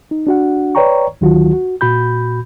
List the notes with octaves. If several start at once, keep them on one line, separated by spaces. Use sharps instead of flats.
D#4
D4 F#4 F#5
B4 C#5 D5 G5 A#5 C#6
D2 D#3 F#3 F4 F#4
F#4
A#2 F#4 B5 G6